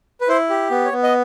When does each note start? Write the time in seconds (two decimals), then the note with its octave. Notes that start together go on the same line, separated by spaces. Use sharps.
0.21 B4
0.28 E4 C5
0.50 G4
0.71 B3
0.85 C#5
0.92 B3
1.03 D#5